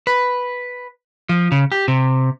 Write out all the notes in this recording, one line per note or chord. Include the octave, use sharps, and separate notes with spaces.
B4
F3
C#3
G4
C3